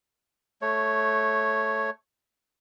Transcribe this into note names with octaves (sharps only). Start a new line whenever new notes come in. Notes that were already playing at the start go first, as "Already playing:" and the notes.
A3 C#5